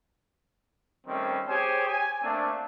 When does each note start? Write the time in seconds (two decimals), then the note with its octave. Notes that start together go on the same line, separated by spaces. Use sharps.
1.07 D#3 G3 A3 C4 C#4
1.48 G4 G#4 C5 C#5 G#5
1.87 G#5
2.23 A3 A#3 C4 D4